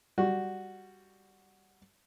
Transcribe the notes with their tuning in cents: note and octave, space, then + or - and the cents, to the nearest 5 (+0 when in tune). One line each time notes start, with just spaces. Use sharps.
G3 +0 F#4 +0